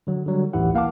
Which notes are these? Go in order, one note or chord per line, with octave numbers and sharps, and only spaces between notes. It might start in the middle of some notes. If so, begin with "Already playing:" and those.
D3 F#3
D3 F#3 G3
A1 D2 E3 E4 G4 F#5
A#3 F5 F#5 A5 D6